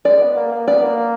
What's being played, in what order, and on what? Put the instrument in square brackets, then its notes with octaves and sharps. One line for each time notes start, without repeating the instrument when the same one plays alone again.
[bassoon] G#3 [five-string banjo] D5
[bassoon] B3
A#3
A#3
[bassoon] B3 [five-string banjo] D5
[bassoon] A#3